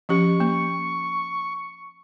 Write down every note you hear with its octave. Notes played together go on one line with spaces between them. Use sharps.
F3 C#4 G4 C#6
A#3